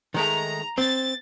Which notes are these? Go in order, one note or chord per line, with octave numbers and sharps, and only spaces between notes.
D#3 G#3 A3 A#5
C4 A6